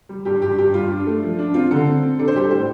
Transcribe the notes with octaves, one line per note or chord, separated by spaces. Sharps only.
G3
G2 G4
G2 G4
G2 G4
G3 F4
D4
A3
F3
D4
C4 F4
D3 A4
C4
C4
D4 A4
C5
G3 G4
A4
A2 C5